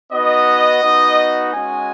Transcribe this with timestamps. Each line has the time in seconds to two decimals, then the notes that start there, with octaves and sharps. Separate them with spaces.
0.12 B3 D#4 F#4 D#5
0.82 B3 D#4 F#4
1.53 G#3 C#4 F#4 G#5